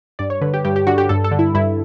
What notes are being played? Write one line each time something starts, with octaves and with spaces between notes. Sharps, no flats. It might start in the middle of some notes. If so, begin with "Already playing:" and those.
G2 D5
C#5
D3 B4
G4
G2 G4
G4
D3 F#4
G4
G2 A4
A4
D3
E4
G2 E4